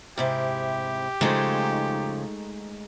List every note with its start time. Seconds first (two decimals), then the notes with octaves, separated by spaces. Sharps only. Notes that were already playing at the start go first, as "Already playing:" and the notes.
0.18 G#2 C3 E4 G4
1.21 C#3 F3 G#3 A3 D#4